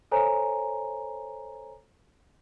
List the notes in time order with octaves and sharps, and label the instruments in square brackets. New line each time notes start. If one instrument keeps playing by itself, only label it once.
[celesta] A4 C5 C#5 G#5 A#5